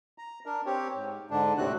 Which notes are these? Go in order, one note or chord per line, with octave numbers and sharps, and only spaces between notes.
A#5
D4 A#4
C4 G4 C#5
G#2
G#2 D3 D4
D#2 A2 C3 C4 F#4 F#6